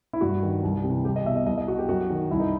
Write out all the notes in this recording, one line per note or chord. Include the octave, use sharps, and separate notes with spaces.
E4
G2 F#4
D#3
C2
C3
E3
C2 G4
D#5
B2 E5
D#5
C2 D#5
D#5
B2 F#4
G4
F#2 F#4
D#3
C2 E4
D#4